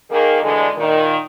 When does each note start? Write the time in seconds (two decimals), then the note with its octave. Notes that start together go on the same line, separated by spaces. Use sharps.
0.11 D#3 A#3 G#4
0.42 D2 D3 E3 G#3
0.77 A#2 D#3